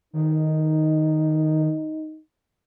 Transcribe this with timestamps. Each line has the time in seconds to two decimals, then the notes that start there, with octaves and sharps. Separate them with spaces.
0.13 D#3 D#4